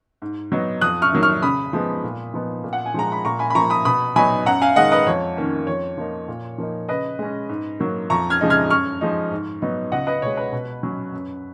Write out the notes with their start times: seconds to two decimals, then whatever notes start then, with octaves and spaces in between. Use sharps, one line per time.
0.22 G#2
0.52 F#3 B3 D#4
0.81 F2 D#6 F#6
1.02 C#6 F6
1.12 D#3 F#3 A#3
1.23 C#6 F6
1.42 C#3 B5 D#6
1.73 F3 G#3 B3 D#4
2.04 A#2
2.34 F3 B3 D#4
2.64 A#2
2.73 F#5
2.86 G#5
2.94 F3 G#3 A#5
3.12 B5
3.25 A#2 A#5 C#6
3.39 G#5 B5
3.50 B5
3.55 F3 A#3 A#5 C#6
3.70 B5 D#6
3.85 B2 B5 D#6
4.16 F#3 B3 D#4 G#5 B5
4.46 F#2 F#5 A#5
4.61 F5 G#5
4.76 D#3 G#3 D#5 F#5
4.92 B4 D#5
5.07 F2 C#5
5.37 D#3 A#3 C#4
5.67 F2 C#5
5.98 F3 A#3 D#4
6.28 A#2
6.58 F3 A#3 D#4
6.89 C#3 B4 D#5
7.19 G#3 C#4
7.49 G#2
7.80 F#3 A#3
8.10 F2 A#5 C#6
8.30 F6 G#6
8.41 C#3 F3 G#3 D#4
8.50 F6 G#6
8.70 F#2 C#6 F6
9.01 F3 G#3 D#4
9.31 G#2
9.62 F#3 B3 D#4
9.92 C#2 D#5 F#5
10.07 B4 D#5
10.22 B2 G#3 C#5
10.37 B4
10.52 B2
10.83 F#3 C#4
11.13 F#2